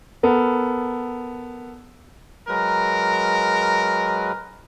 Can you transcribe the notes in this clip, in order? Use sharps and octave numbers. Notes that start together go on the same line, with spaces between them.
B3 A4 A#4
F#3 G#3 A#4 B4